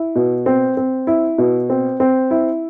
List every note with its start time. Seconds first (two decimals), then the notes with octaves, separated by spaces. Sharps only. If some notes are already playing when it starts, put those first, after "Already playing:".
Already playing: E4
0.15 B2
0.46 C4
0.77 C4
1.07 E4
1.38 B2
1.70 C4
2.00 C4
2.31 E4